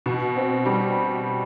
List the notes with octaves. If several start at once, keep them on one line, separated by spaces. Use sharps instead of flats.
B2
C4
G3